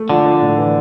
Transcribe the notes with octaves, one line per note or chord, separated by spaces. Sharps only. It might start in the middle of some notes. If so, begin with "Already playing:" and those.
Already playing: A3
D3 F3
D4
A2
E3